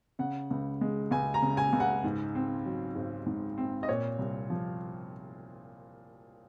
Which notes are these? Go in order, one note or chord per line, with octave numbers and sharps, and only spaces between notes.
C#3 F#5
C#2
G#3
C#2 G#5
A#5
C#3
G#5
C#2
F#5
G#2
C4
F#3
G#1
G#2
C4
D#5
A#2 C#5
C2
F3